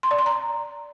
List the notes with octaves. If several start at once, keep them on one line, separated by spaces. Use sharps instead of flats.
C6
D5
C6
A#5